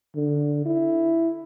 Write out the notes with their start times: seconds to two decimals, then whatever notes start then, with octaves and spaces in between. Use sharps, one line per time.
0.15 D3
0.65 E4